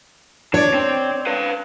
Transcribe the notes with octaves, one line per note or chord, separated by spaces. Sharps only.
D4 C#5 D5
C4
B4 F5